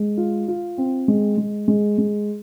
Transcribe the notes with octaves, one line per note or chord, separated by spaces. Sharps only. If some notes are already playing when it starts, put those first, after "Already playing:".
Already playing: G#3
F4
F4
C4
G#3
G#3
G#3
G#3